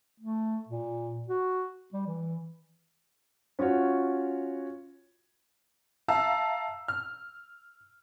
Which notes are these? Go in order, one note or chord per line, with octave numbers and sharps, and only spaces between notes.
A3
A#2
F#4
G3
E3
C#4 F4 F#4 C#5
E5 F5 A5 A#5 E6
F6